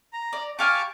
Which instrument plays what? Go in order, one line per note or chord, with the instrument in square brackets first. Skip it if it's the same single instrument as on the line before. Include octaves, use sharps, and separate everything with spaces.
[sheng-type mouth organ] A#5
[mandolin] D5
[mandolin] G4 F5 G#5 [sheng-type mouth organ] A5 C#6 D6